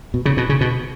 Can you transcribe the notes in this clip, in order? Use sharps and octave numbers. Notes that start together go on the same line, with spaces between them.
B2
C#3
B2
C#3
B2